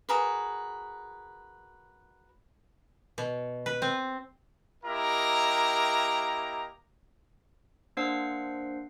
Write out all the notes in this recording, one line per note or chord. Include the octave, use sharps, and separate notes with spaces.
F#4 G#4 A#4 B4
B2
B4
C4
A#3 E4 G4 A#4 D#5 A#5
A#3 D4 C5 F#5 C7